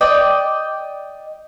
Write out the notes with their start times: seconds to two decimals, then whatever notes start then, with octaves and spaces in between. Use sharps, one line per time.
0.01 D5 D#5 G5